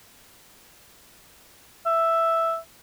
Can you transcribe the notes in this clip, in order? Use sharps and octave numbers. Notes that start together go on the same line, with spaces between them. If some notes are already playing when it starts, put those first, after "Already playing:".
E5